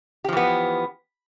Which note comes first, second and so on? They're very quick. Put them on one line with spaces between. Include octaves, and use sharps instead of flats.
G4 F3 E3 B3